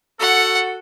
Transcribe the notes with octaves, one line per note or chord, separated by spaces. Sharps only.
F#4 A4 F#5